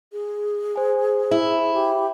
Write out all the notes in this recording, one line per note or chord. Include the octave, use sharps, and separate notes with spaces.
G#4
C5 G#5
E4
G4